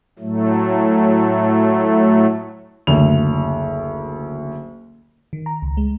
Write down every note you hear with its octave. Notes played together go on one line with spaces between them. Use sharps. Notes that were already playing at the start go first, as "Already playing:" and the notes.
A2 F#3 A3
F#1 D2 F7
D#3
A#5
C#2
G#3